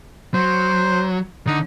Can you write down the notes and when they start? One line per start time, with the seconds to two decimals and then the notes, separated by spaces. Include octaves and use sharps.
0.34 F#3 C5
1.47 D3 D#4